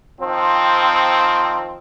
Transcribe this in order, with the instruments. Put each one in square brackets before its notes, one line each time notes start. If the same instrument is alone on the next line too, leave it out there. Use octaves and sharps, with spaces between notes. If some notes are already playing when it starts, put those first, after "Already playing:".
[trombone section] D#3 F3 C4